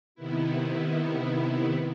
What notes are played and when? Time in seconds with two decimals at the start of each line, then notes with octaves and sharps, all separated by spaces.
0.15 C3 D#3 B3 E4